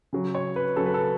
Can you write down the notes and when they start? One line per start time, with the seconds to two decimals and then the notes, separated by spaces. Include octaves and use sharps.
0.13 C#3 F#3
0.35 C#5
0.56 B4
0.76 C#3 F#3 A4
0.86 B4
0.94 A4